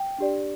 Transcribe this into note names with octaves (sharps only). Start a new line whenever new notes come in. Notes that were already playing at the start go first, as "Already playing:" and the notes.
Already playing: G5
D4 G4 D5